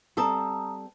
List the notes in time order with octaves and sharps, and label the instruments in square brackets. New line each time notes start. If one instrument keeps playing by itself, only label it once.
[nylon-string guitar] G3 C4 A4 [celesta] A#5 D#6 E6